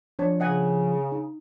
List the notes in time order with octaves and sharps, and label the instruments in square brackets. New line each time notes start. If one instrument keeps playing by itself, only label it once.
[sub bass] F3 [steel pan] D4 C#5 A5
[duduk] C#3 [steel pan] D#5 F#5 G#5
[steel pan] D#4